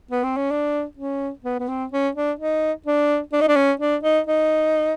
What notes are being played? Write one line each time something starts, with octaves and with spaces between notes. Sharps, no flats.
B3
C4
C#4
D4
C#4
B3
B3
C4
C#4
D4
D#4
D4
D4
D#4
D4
C#4
D4
D#4
D#4